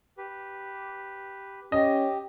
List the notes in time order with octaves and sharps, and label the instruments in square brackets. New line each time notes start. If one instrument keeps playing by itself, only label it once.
[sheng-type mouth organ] G4 B4
[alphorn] C#4 [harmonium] G4 [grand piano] D#5